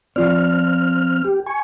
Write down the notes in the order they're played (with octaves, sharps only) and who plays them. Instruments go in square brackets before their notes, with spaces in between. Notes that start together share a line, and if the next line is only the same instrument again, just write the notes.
[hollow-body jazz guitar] F3 F4 D5 [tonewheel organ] C4 F6
[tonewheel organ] G4
G#5 C#6